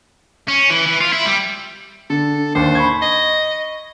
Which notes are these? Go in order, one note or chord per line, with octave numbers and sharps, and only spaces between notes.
C#4
E3
E3
F4
E4
G3
D3 A4
D#2 D4 C5
B5 C#6 G#6
D#5